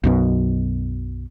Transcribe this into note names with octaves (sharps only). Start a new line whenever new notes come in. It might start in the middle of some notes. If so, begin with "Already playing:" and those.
B1 F#2 B2